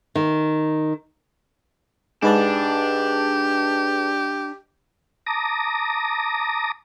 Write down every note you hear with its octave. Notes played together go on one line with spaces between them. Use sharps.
D#3
G#2 D4 G4 G#4 B4 A5
A5 A#5 D6 D#6 A#6